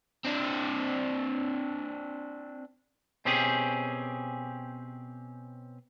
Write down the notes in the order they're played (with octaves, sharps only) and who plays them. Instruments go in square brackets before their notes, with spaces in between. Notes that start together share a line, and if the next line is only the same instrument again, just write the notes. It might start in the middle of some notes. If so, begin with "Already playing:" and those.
[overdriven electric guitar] C4 D4
[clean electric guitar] B2 C4 C#4 G4 G#4